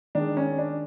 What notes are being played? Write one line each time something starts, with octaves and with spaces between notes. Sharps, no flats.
D#3 G#3 D4
C#4
D4